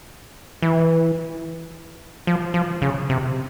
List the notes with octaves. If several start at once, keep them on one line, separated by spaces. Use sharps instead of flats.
E3
F3
F3
C#3
C3